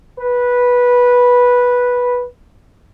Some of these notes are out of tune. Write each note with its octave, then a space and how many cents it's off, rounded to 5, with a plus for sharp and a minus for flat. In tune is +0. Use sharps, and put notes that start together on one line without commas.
B4 -10